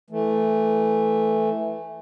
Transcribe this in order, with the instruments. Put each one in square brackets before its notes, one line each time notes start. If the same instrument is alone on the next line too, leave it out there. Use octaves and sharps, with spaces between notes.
[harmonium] E3 A3